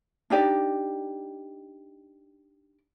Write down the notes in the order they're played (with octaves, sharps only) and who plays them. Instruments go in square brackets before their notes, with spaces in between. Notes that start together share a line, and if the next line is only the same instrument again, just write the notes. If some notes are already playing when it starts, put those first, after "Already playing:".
[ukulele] D4 D#4 G4 D5